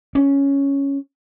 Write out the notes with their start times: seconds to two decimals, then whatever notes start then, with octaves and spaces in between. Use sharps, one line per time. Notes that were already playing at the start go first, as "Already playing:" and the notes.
0.15 C#4